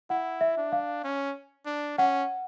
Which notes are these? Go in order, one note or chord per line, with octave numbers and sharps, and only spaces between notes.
E4 F#5
E5
D4
F5
C#4
D4
C#4 F#5